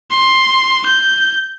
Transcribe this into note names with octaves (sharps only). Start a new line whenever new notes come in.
C6
G6